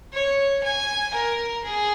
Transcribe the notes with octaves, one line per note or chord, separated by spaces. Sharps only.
C#5
G#5
A#4
G#4